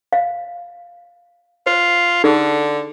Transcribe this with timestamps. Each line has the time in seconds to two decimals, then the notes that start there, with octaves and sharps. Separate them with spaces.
0.13 F5
1.66 F4 C5
2.24 D3 D#4 G#4 A4